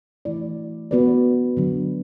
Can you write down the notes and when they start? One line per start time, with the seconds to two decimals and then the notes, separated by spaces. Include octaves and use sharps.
0.25 E3 A3 E4 D5
0.91 B3 F#4 B4 D5
1.57 D3 F#3 D4